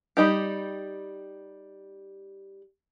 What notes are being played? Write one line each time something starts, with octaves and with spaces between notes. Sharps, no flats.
G3 D#4 G4